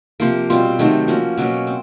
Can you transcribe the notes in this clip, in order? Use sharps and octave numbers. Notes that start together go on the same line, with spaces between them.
C3 F3 A#3
B2 G3 C4 F4
C3 D#3 F#3 A3
F3 A#3 C#4 F#4
B2 F#3 A#3 C#4
C4